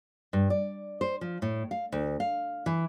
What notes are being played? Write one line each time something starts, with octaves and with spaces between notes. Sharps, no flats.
G2
D5
C5
F3
A2
F5
D2
F5
E3